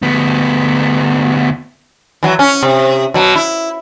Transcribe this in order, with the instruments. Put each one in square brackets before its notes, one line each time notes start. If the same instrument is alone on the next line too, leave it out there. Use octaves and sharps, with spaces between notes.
[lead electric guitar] D2 B3
[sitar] E3 F#3
C#4
C3
B2 F#3
E4